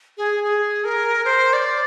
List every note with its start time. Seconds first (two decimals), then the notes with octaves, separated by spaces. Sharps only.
0.17 G#4
0.44 G#4
0.84 A#4
1.25 C5
1.53 D5